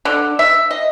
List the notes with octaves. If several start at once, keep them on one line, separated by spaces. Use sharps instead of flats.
D3
E5
D#5